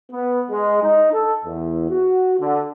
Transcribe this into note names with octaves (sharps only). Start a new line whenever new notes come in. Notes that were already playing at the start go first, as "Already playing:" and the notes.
B3
G#3
D#4
A4
E2
F#4
D3